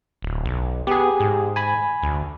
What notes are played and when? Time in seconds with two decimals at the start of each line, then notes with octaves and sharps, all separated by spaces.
0.22 D1
0.45 B1
0.87 B3 G4 G#4
1.20 G#2
1.56 G#5 B5
2.03 D2